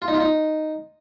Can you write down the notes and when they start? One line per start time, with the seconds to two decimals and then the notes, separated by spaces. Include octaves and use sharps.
0.02 F4
0.08 D#4
0.14 F4
0.20 D#4